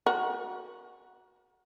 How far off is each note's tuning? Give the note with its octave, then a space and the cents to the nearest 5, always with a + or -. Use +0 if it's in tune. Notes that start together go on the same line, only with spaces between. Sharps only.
F#4 +0 A#4 +25